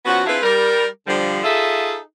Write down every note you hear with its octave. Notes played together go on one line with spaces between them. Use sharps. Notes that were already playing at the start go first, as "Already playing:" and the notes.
F3 B3 C#4 F#4
C4 D4 E4 F4 G#4 B4
G3 A#4
D3 F3 G3
D#4 F4 G#4 A4 E5